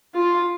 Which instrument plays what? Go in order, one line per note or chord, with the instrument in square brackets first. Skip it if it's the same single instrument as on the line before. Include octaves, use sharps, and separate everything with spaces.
[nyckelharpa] F4